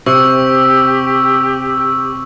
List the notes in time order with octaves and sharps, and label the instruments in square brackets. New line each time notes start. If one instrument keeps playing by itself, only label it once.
[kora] C3 [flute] G4 [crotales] C#6 E6